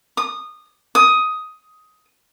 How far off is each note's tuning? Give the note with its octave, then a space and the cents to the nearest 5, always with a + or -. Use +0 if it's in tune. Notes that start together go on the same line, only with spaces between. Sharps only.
D#6 -20
D#6 +10